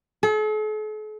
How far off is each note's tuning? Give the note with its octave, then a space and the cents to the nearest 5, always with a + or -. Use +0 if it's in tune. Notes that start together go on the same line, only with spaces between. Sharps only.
A4 -45